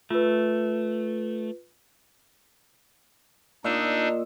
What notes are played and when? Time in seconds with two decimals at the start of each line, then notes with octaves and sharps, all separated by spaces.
0.10 A3 F4 B4
3.64 A#2 D4 D#4 D#5 E6